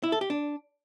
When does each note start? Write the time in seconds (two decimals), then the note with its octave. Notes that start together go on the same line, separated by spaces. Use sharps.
0.03 E4
0.12 A4
0.21 G4
0.30 D4